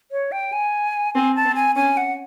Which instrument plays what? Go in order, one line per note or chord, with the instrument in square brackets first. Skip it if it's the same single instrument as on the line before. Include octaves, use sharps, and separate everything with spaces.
[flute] C#5
G5
G#5
[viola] C4 [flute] G#5
[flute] A5
[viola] C4
[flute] G#5
[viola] C#4 [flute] G#5
[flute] F#5